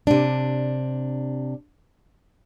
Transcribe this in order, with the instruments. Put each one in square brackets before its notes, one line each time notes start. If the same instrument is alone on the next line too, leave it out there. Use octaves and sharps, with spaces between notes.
[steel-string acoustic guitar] C3 D4